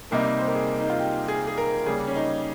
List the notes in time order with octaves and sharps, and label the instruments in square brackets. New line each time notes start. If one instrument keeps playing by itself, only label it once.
[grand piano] C3 G3 A#3 D#4 [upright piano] A#4
[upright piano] C5
A#4
G#4
D#4
F4
G4
G#4
G#4
A#4
[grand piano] C#3 G3 A#3 [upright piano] G#4
[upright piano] C#4
D#4